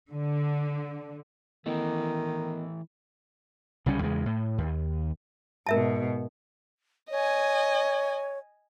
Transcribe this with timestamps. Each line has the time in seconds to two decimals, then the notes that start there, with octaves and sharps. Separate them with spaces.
0.11 D3
1.66 D#3 E3 A3 B3 E4 D#5
3.86 C2 C#3 G3 C#4
4.02 E2 C#3 G#3
4.26 A2
4.58 D#2
5.67 G#2 B2 A#4 E5 A5
7.10 C#5 D#5 G#5